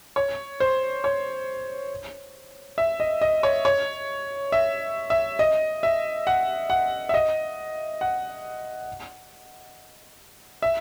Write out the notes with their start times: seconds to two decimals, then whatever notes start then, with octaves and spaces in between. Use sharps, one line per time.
0.16 C#5
0.60 C5
1.04 C#5
2.78 E5
3.00 D#5
3.21 D#5
3.43 C#5
3.65 C#5
4.52 E5
5.10 E5
5.39 D#5
5.83 E5
6.27 F#5
6.70 F#5
7.09 E5
7.14 D#5
8.01 F#5
10.62 E5